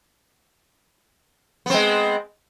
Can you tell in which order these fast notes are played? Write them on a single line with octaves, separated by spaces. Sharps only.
B3 C4 G#3